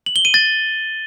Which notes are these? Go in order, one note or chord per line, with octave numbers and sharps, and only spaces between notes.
F#7
G7
D#7
A6